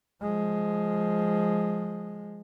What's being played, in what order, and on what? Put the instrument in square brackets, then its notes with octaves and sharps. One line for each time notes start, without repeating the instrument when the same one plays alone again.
[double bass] F3 G#3